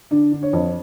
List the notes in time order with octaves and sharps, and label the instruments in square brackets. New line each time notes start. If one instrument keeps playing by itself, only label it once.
[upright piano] D3 D4
D3
C#5
F2